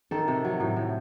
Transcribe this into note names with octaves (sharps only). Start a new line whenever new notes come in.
D#3 A4
C3
F#3
A2
A2